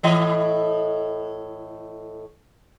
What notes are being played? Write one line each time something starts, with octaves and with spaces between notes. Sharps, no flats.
A2 E3 D#5